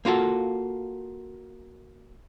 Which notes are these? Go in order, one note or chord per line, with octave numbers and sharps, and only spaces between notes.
A#3 F4 F#4 A4